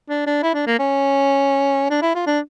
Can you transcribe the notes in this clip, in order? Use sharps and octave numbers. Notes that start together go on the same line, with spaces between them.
D4
D4
E4
D4
A#3
C#4
D4
E4
F4
D4